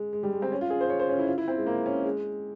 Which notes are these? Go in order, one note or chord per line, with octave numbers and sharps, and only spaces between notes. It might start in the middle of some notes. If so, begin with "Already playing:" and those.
Already playing: G#3
G#3
G3
G#3
C4
C#4
F4
G#4
C5
C#5
C5
C#4
E4
F4
E4
C4
G#3
A#3
C#4
G#3